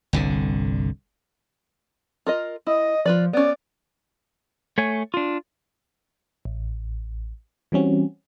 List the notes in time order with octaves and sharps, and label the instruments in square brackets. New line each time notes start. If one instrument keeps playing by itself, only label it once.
[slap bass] G1 C2 D3
[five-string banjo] F4 A#4 D#5
[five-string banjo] E4 [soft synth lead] D#5
[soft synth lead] F3 [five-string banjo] F4 B4 D5
[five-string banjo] B3 C#4 [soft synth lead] D5
[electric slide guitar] A3 C#5 G#5
D4 F4
[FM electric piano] A1
E3 G3 C4 C#4 F#4